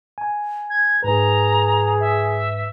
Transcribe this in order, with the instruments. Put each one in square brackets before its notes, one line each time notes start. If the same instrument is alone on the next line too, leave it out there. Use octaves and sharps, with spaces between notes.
[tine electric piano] G#5
[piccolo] G#6
[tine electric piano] G#2 B4 [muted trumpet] G#4 [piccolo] A#5
[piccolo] E5